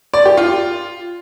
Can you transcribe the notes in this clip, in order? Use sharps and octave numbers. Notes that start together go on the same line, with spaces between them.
D5
G4
F4